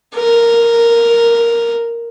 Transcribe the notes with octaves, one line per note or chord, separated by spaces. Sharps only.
A#4